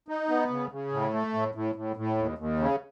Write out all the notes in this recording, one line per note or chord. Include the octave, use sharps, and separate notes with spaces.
D#4
B3
C#3
C#3
A2
A3
A2
A2
A2
A2
D#2
D#2
C#3